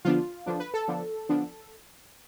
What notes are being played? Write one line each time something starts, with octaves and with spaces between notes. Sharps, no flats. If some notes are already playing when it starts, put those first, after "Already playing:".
D3 F3 B3 D4 F4
D3 F3 B3 D4
B4
A4
D3 F3 B3 D4
D3 F3 B3 D4